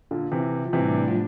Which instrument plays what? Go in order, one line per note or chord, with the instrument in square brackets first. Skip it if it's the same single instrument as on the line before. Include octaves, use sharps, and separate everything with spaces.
[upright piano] A#2 D3
C3 E3
F3
[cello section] A2 G3 D4 [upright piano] C3 E3
[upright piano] F3